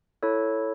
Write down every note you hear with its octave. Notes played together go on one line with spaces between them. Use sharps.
E4 A4 C#5